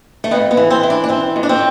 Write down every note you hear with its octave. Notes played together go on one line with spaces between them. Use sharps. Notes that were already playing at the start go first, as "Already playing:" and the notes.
A3
F2 B3
B3
E3
C4
E3
D4
D4
E3 C4
F2
D4
C4